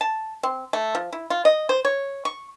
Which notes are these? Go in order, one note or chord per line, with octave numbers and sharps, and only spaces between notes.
A5
C4
A3
F3
E4
F4
D#5
C5
C#5
C#6